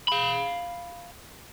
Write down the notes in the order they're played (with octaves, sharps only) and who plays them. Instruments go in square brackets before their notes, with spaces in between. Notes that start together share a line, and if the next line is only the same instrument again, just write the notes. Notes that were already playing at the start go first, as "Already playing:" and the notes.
[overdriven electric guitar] F5 B5